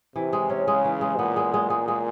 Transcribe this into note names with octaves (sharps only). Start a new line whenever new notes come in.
C3 E3
G#3
C#4
C#3 G#3
E3
G#3
A#2 B3
G#3
G#3
G#3
G#3